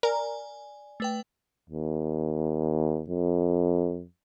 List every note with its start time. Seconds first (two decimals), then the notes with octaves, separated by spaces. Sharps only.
0.03 A#4 D5 G#5
1.00 A3 B4 G5
1.70 D#2
3.10 F2